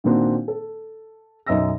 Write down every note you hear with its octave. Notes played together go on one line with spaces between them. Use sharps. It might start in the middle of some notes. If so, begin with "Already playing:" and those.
A#2 D#3 A#3 C4 D4 F#4
A4
B1 F#2 D#5 E5 E6 A#6